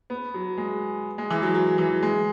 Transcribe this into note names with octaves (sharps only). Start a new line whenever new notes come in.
B3
F#3
G#3
G#3
E3
F#3
F#3
E3
G#3